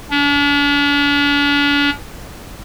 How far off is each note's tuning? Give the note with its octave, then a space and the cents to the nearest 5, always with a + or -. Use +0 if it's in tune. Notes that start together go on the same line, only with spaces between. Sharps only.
D4 -45